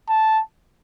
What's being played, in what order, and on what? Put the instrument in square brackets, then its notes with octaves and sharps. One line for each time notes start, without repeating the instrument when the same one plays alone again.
[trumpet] A5